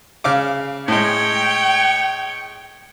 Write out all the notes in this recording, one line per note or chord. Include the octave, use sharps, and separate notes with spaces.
C#3 F5 D6
A2 G#3 C#5 G5